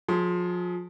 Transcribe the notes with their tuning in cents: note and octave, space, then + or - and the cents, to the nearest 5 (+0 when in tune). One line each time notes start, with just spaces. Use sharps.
F3 +35 G#4 +35 C6 +0